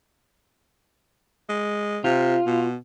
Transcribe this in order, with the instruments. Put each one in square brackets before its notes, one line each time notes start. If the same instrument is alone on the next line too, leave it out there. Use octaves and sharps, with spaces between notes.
[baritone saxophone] G#3
[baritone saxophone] C3 [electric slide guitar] F4
[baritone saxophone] B2